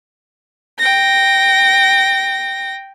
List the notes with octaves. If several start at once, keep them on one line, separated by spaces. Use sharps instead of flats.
G5 A#6